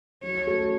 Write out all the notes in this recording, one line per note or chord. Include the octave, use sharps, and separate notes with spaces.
F#3 C#5
A3 C#4 F#4 A4